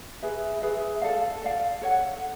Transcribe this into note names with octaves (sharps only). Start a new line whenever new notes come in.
G#4 B4 E5
G#4 B4 E5
A4 D5 F5
A4 D5 F5
A4 C#5 F#5